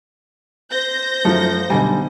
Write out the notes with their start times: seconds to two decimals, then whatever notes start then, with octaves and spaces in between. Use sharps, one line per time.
0.70 C5 G6 A#6
1.25 F#2 F3 A3
1.70 B1 B2 D3 G3 G#5